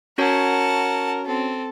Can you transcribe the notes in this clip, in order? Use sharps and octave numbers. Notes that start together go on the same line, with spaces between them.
C#4 F#4 A#4 C#5 F#5 A5
C4 A4